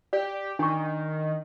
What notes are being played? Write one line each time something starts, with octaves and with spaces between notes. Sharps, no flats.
G4 D5
D#3 D4 C#6